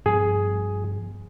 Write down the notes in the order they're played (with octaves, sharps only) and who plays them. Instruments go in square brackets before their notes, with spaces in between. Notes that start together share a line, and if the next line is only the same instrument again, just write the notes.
[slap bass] G2 F3 B3 [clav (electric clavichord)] G#4